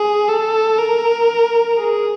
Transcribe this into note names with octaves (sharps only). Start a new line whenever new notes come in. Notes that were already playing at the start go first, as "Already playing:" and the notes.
Already playing: G#4
A4
A#4
G#4